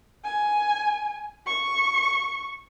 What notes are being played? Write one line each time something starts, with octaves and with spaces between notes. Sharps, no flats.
G#5
C#6